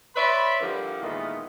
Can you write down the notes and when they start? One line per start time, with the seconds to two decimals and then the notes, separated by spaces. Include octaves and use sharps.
0.15 B4 C#5 D5 E5 B5 C6
0.60 D3 F3 G3 A#3 E4
1.02 A#2 D#3 E3 G#3 A3 B3